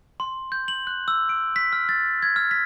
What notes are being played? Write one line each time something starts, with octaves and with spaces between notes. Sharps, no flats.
C6
G6
F#7
F#6
E6
D7
B6
F6
A6
G#6
F6
B6